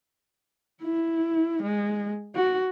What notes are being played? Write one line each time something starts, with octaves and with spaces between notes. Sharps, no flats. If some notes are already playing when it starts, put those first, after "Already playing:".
E4
G#3
F#4